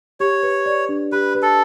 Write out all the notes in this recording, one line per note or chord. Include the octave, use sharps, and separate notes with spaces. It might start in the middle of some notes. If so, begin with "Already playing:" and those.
G4 C#5
B4
D5
D4
G4 B4
B4
A4